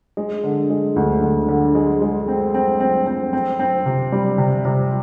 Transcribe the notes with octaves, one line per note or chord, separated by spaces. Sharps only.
G#3
D3
G#3
D2
D2
D3
G#3
G#3
C4
C4
C4
C4
C4
C4
C3
G3
C3
C3